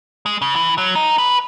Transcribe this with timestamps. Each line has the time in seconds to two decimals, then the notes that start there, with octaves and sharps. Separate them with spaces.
0.26 G#3
0.42 C#3
0.56 E3
0.78 F#3
0.95 D#4
1.18 B4